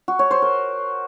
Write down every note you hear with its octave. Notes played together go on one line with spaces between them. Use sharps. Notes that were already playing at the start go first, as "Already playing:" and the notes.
F#4
C#5
C5
A#4